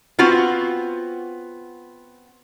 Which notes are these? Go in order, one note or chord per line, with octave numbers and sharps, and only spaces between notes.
B3 C4 F4 F#4